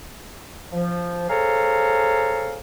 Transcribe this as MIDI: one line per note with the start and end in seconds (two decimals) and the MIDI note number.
0.73 1.25 53
1.30 2.59 68
1.30 2.59 69
1.30 2.59 72
1.30 2.59 73
1.30 2.59 77
1.30 2.59 82